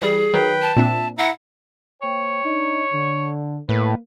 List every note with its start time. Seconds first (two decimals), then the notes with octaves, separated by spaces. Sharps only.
0.02 E3 G3 G#4
0.34 D#3 F#3 B4 G5
0.62 A5
0.76 A#2 C4 D4 E5
1.18 E4 E5 F#5 A#5
2.02 A#3 C5 C#5 G5
2.44 D4 D#4
2.93 D3
3.69 A2 A#3 B4